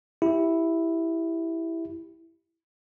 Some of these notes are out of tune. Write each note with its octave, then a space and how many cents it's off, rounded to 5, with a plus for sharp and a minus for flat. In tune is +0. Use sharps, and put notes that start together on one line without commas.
E4 +0 G4 +0